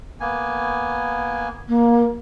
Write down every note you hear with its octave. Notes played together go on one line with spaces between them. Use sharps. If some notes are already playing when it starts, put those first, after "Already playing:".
A#3 B3 G#5
A#3